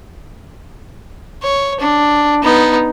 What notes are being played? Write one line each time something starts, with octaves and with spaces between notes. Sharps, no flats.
C#5
D4
B3 D#4